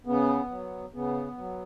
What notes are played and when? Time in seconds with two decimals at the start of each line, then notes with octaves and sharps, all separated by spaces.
0.06 C#3 B3
0.51 F#3
0.94 C#3 B3
1.38 F#3